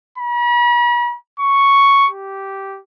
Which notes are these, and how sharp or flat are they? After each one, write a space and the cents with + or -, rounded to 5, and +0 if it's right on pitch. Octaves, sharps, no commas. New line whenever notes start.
B5 -45
C#6 +0
G4 -10